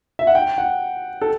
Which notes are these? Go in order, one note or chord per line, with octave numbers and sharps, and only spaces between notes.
E5
F#5
G5
F#5
A4